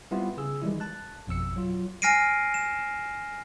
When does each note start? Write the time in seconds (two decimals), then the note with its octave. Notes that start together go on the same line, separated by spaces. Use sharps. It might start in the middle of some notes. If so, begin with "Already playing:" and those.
0.11 G3 B3 C4 E4 F4 G4
0.37 C#3 G#4 E6
0.62 D#3 E3 G3 G#3 E4
0.80 A5 F#6
1.27 G#1 F2 B2 E6 C#7
1.56 F#3 F4
2.02 G#5 F6 A#6 C7 D7 D#7
2.54 E7